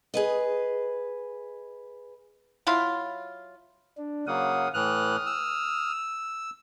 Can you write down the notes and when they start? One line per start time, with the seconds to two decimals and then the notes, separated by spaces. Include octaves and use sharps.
0.14 G#4 B4 D#5
2.67 F#3 E4 F4
3.98 D4
4.27 C#3 F#3 A#3 F5 F#5 D#6
4.74 A2 E3 D#6 F6 F#6
5.26 E6